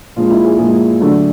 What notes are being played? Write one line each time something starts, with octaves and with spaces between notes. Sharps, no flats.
A#2 F3 G#3 F4
E4
G#4
A#2 F3 G#3 G#4
D3 F#3 A3